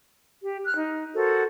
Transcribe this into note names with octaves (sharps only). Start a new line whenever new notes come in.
G4
F6 F#6
D#4
F#4 A4 A#4 C5